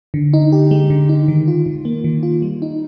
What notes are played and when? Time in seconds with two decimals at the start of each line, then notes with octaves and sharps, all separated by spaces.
0.14 D3
0.33 D#4
0.52 G4
0.71 G#3
0.90 D3
1.09 D#4
1.28 D#3
1.48 F4
1.66 D#3
1.85 A#3
2.04 D#3
2.23 F4
2.42 G3
2.62 D#4